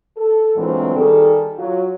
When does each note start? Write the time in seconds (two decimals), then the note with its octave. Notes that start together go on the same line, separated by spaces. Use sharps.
0.17 A4
0.57 D2 A#2 E3 F#3 G#3 C4
0.96 D#3 G3 G#4 A4
1.58 F#3 F4